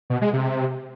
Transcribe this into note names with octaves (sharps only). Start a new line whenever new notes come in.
B2
G#3
C3